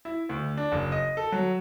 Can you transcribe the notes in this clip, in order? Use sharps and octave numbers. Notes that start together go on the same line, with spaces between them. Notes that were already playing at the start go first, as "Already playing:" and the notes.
E4
D2
D4
F#1
D#5
A4
F#3